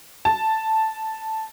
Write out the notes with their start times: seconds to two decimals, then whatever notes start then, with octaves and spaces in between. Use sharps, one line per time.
0.25 A5